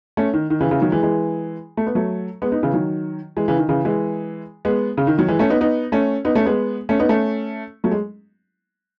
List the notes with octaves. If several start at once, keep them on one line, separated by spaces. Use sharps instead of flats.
A3 C#4
D#3
D#3
C#3 E3
C#3 E3
D#3 F#3
E3 G#3
E3 G#3
A3
B3
F#3 A3
G#3 B3
B3 D#4
C#3 E3
D#3 F#3
E3 G#3
C#3 E3
D#3
C#3 E3
E3 G#3
G#3 B3
C#3
D#3
D#3 F#3
E3 G#3
A3 C#4
B3 D#4
B3 D#4
A3 C#4
B3 D#4
A3 C#4
G#3 B3
A3 C#4
B3 D#4
A3 C#4
F#3 A3
G#3